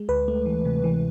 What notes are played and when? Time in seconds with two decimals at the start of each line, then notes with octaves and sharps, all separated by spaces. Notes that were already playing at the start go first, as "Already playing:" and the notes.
Already playing: G#3
0.09 D2 B4
0.28 A3
0.46 E3
0.65 C3
0.84 E3